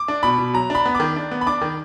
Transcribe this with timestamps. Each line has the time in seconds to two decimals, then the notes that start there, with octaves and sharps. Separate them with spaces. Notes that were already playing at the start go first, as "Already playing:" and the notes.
Already playing: D6
0.08 D4
0.23 B2 B5
0.38 B2
0.53 F#3 A#5
0.70 D4 B5
0.86 B3
0.95 D6
1.00 D#3
1.16 D4
1.31 B3
1.41 B5
1.47 D4 D6
1.62 D#3